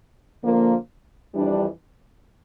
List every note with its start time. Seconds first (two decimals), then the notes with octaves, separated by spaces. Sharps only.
0.43 D3 F3 A#3
1.34 F2 E3 G3 D4